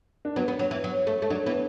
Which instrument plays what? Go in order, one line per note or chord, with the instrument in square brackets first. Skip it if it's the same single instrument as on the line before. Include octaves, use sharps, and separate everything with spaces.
[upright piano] D4
[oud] F#3 [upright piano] B3
[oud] B3
[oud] F#3 [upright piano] B3
[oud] E3
F#3
A3
A3
[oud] F#3 [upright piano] D4
[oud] E3 [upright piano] B3